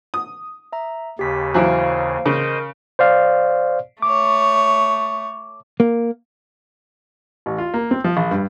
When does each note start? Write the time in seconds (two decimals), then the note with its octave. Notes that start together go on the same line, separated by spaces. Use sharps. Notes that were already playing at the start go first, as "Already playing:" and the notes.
0.14 D#6
0.72 E5 A#5
1.19 D#2 C#3 G4 B6
1.54 E3 F#3 C5 F5 D7
2.26 C#3 A#4 C5 D#5
2.99 C5 D5 F5
4.02 A3 C#5 D6
5.80 A#3
7.46 A1
7.58 F4
7.74 A#3
7.91 C4
8.04 F3
8.17 A#1
8.31 G2